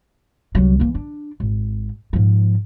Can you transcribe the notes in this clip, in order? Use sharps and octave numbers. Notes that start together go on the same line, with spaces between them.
C2 F#3
E3 A#3
D4
G#1
G#2 F3